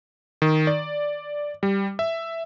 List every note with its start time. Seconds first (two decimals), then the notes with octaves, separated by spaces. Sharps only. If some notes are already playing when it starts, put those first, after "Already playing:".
0.42 D#3
0.67 D5
1.63 G3
1.99 E5